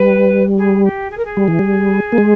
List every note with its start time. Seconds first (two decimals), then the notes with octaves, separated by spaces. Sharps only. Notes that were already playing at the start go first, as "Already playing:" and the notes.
Already playing: G3 B4
0.57 G#4
0.83 G4
1.10 G#4
1.17 A#4
1.25 G#4
1.37 G3
1.48 E3
1.59 G3
2.12 A#3
2.18 G#3